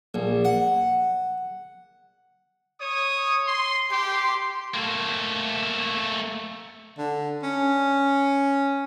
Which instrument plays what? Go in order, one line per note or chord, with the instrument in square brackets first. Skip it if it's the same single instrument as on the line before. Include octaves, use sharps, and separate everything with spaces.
[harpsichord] A#1
F#5
[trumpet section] C#5 D#6
C6
[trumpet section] G4 [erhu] C6
[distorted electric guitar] A3 A#3
[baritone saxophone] D3
C#4